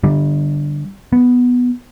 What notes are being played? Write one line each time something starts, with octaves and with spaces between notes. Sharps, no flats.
D3 G3
B3